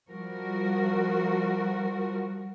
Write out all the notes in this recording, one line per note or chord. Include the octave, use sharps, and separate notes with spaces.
F3 G3 F#4 A#4